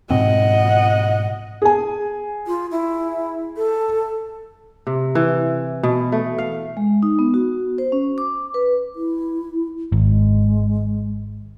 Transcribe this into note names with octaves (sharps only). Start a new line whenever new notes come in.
G#2 B2 C4 D#5 F#5
G#4 G#5
F4
E4
A4
C3
E3
B2
A3
F5
G#3
D#4
B3
F#4
C5
C#4
D6
B4
E4
G#1 G#3